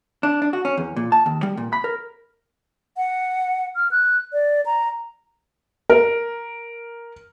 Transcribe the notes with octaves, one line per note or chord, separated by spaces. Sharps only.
D4
D4
F#4
C#4
E2
A#2
A5
D#2
G3
A#2
B5
A#4
F#5
F6
F#6
D5
A#5
A#4